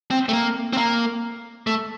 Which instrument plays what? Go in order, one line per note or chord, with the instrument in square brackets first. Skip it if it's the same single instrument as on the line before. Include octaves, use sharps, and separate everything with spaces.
[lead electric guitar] C4
A3
A#3
C4
A#3
A3